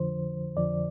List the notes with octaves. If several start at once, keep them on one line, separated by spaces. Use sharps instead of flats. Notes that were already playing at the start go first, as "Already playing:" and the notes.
Already playing: F2 D3 F3 C5
F2 D3 F3 D5